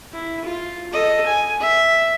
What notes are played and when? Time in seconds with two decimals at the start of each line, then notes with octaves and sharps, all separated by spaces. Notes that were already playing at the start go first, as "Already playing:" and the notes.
0.13 E4
0.45 F4
0.93 A4 D#5
1.26 G#5
1.60 E5